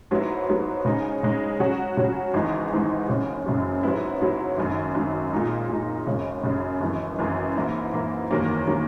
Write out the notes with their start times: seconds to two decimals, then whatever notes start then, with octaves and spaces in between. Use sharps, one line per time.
0.11 G#2 F#3 B3 E4
0.49 G#2 F#3 B3 E4
0.85 C#3 G#3 D#4
1.23 C#3 G#3 D#4
1.60 C#3 F#3 C#4 F#4
1.97 C#3 F#3 C#4 F#4
2.34 G#1 G#2 E3 G#3 D#4
2.72 G#1 G#2 E3 G#3 D#4
3.08 F#1 F#2 C#3
3.46 F#1 F#2 C#3
3.83 G#2 F#3 B3 E4
4.21 G#2 F#3 B3 E4
4.58 G#1 F#2 D#3
4.95 G#1 F#2 D#3
5.32 A#2 G#3 D#4
5.69 A#2 G#3 D#4
6.06 G#1 F#2 C#3
6.43 G#1 F#2 C#3
6.81 G#1 F#2 E3
7.18 G#1 F#2 E3
7.56 G#2 E3 A#3 E4
7.93 G#2 E3 A#3 E4
8.31 F#1 E2 D#3 F#3 A#3
8.67 D#3 F#3 A#3